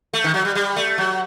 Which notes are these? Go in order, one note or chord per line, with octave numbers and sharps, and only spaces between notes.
A3
D#3
F#3
G3
G3
A3
F#3